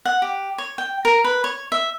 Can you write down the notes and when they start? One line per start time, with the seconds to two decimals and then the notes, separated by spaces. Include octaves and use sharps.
0.05 F#5
0.22 G4
0.58 C#5
0.78 G5
1.05 A#4
1.24 B4
1.44 C#5
1.72 E5